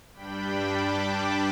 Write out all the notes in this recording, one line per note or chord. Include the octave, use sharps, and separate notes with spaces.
G2 G3 D4 G5 B5
A5 D6